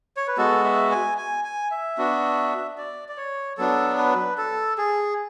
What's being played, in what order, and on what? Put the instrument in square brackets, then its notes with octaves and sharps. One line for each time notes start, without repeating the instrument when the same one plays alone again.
[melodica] C#5
B4
G#3 B3 F#4 A4
E5
G#5
G#5
G#5
E5
B3 D4 F#4
D5
D5
C#5
F#3 B3 D4 A4
B4
A4
G#4